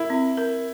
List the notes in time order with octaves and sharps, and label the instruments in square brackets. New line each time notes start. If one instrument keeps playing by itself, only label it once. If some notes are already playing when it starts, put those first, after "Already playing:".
Already playing: [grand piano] E4 [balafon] A#4
[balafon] C4
A#4